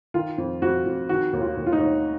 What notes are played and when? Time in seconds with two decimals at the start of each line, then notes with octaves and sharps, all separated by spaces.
0.14 D#3 F4
0.38 F2
0.62 F2 F#4
0.86 F2
1.09 D#3 F#4
1.33 D#2
1.41 F4
1.57 D#2
1.66 F4
1.72 D#4
1.80 D#2